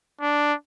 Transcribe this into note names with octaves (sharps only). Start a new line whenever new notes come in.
D4